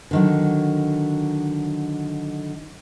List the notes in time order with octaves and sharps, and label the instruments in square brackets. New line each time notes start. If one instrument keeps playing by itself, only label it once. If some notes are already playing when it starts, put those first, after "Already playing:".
[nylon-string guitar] D3 D#3 F#3